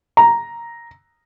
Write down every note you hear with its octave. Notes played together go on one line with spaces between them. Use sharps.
A#5